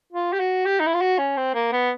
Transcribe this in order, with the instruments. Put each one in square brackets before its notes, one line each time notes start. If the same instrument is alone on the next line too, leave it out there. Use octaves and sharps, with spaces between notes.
[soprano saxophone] F4
G4
F#4
G4
D#4
E4
F4
F#4
C#4
C4
A#3
B3